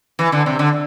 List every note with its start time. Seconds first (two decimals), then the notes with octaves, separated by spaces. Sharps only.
0.19 E3
0.32 D3
0.46 C3
0.59 D3